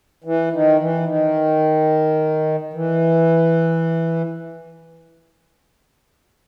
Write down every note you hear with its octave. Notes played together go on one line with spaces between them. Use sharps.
E3
D#3
E3
D#3
E3